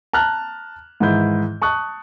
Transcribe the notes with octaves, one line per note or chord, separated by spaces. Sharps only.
A5 A#5 F6 F#6
G#2 D#3 E3 E4 G6
A5 C#6 D#6 F#6